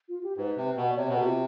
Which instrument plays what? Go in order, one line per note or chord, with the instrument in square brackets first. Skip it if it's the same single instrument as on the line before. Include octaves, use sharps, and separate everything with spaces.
[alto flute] F4
G4
[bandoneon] G#2 [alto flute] B4
[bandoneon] C3
B2
[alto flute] D5
[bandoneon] C3 [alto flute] C#5
[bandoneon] B2 [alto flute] B4
[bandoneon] C3 [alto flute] F#4
[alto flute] F4